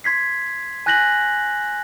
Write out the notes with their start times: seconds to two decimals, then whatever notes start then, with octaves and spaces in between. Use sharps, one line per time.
0.04 C6 G#6 B6 C7
0.86 G#5 F#6 G6 A#6 B6 F#7